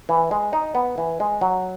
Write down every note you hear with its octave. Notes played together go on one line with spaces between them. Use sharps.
E3
G#3
D#4
B3
E3
G#3
F#3